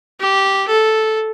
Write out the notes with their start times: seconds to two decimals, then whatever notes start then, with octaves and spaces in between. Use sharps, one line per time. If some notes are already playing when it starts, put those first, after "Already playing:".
0.20 G4
0.68 A4